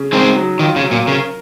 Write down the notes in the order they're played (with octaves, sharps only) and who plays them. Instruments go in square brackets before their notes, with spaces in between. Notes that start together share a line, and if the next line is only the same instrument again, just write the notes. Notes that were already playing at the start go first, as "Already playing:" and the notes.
Already playing: [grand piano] C#3
[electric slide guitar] G#3 C4 [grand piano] D#4
[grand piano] F#3
[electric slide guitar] D#3 [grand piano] F4
[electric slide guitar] C#3
[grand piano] F#3
[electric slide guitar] A#2
[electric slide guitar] C#3 [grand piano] A#4